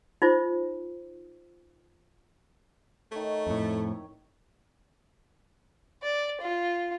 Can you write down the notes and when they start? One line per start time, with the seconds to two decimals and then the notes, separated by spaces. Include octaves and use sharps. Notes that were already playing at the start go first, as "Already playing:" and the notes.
0.22 D#4 F4 C5
3.12 D#3 A3 C#5
3.47 F2 A2
6.03 D5
6.41 F4